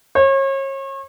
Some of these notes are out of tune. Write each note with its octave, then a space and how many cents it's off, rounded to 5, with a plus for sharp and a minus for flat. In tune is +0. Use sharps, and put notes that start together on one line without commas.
C#5 -35